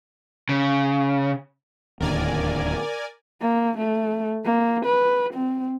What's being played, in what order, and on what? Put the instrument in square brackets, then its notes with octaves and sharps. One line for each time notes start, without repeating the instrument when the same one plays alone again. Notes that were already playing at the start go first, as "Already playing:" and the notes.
[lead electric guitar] C#3
[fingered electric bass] D1 D#2 D3 [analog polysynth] A#4 D5 G#5
[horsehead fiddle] A#3
A3
A#3
B4
C4